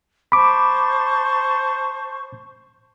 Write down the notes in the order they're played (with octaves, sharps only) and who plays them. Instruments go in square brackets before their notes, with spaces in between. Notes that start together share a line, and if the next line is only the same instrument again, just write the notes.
[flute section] C5 A5 C#6 [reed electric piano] B5 D6